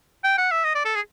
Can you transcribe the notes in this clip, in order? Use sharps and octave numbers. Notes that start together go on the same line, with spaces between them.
G5
F#5
E5
D#5
D5
A4
G#4